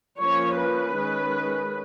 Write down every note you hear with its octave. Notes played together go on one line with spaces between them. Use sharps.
F3 A#3 C#4 C#5
B4
D#3 G#3 C#4